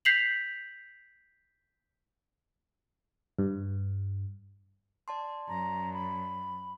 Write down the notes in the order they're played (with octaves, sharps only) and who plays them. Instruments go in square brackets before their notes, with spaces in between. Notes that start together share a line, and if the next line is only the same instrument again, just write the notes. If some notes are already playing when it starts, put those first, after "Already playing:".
[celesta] G6 B6 C7 F7 F#7
[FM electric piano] G2
[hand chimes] D5 A5 C6
[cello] F#2 [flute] A#5
[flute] B5